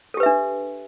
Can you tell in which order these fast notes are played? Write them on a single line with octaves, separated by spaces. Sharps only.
A4 G4 B4 E5 D4